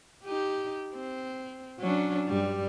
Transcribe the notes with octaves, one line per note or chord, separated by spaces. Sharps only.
D#4 G4
C4
F#3 C#4 D4
G2 G3